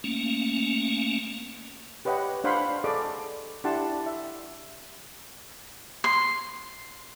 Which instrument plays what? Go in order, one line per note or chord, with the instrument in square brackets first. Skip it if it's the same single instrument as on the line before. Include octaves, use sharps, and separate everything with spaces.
[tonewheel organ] A3 A#3 C#4
[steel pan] G4 B4 C#5 D#5 F#5 G5
D4 C5 F5 F#5 B5 C6
G#4 A4 D5 D#5 C#6 D6
D4 E4 G4 F#5 A5 C6
E5
[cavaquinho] C6